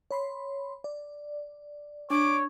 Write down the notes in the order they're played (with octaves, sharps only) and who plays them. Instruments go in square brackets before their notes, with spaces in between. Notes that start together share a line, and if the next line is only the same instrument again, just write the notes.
[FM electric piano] C#5 B5 C6
D5
[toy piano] D4 [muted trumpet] C#5 [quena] D6